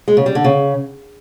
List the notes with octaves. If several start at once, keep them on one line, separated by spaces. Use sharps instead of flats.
G#3
C#3
G3
D3
C#3